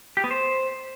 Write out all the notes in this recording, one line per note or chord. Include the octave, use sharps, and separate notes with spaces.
G4
B3
C5